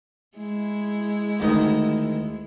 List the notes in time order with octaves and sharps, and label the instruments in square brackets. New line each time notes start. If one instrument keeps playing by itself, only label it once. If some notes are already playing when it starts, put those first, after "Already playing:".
[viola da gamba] G#3 E4
[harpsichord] D2 D#3 D#4